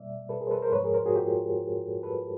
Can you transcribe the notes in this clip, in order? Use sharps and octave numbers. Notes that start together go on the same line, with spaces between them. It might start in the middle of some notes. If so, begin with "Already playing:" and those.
Already playing: B2 G3 A#3 D5 E5
A4 B4
G#4 A#4
C5
A4 B4
A#4 C5
G#2 F3 G#3 B4 C#5
G#4 A#4
A#4 C5
F#4 G#4
F4 G4
A4 B4